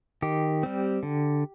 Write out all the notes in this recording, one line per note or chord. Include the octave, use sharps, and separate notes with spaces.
D#3 G4
G3 C4
D3